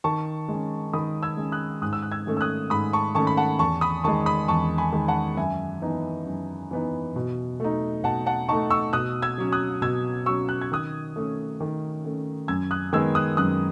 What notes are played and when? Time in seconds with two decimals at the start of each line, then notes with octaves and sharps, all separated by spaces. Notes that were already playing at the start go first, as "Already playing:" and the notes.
0.04 D#3 A5 C#6
0.48 G#3 C#4
0.93 D#3 B5 D#6
1.23 E6 G#6
1.37 G#3 C#4
1.52 D#6 F#6
1.82 G#2 D#6 F#6
1.93 E6
2.02 F#6
2.11 E6 G#6
2.27 D#3 A3 C#4
2.37 E6
2.41 D#6 F#6
2.70 G#2 B5 D#6
2.93 A5 C#6
3.15 D#3 A3 C#4 A5 C#6
3.27 B5
3.37 F#5 A5
3.59 E2 A5 C#6
3.81 B5 D#6
4.04 D#3 G#3 A5 C#6
4.26 B5 D#6
4.48 E2 A5 C#6
4.78 G#5 B5
4.92 D#3 G#3
5.08 F#5 A5
5.37 F#2 E5 G#5
5.82 E3 B3 D#4
6.26 F#2
6.71 E3 B3 D#4
7.16 B2
7.60 A3 D#4
8.04 B2 F#5 A5
8.26 F#5 A5
8.49 A3 D#4 A5 C#6
8.71 C#6 E6
8.93 B2 D#6 F#6
9.22 E6 G#6
9.38 F#3 C#4
9.52 D#6 F#6
9.82 B2 E6 G#6
10.26 F#3 C#4 C#6 E6
10.49 F#6
10.61 G#6
10.72 D#3 D#6 F#6
11.16 A3 C#4
11.60 D#3
12.04 A3 C#4
12.48 F#2 E6 G#6
12.71 D#6 F#6
12.93 D#3 G#3 B3 E6 G#6
13.15 D#6 F#6
13.37 F#2 D#6 F#6